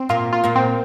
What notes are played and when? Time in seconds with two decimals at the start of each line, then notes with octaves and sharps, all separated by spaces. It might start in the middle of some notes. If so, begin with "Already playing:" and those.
Already playing: C4
0.09 A#2 A#3 F4
0.33 F4
0.44 A#2 A#3
0.55 C4